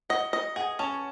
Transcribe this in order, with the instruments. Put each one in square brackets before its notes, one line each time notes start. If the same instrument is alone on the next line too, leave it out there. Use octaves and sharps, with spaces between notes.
[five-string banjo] D#5 [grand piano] F#5
[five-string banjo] D#5
[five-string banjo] G#4 [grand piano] F#5
[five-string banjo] C#4 [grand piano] A5